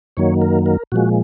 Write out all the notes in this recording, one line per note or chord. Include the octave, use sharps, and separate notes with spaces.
F#2 D#3 F#3 A#3 C#5
A#4
A#4
A#2 F3 G#3 F#4